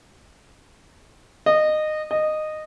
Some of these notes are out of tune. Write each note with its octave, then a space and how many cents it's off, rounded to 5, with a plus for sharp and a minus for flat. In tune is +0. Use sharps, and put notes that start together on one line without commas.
D#5 -20
D#5 -15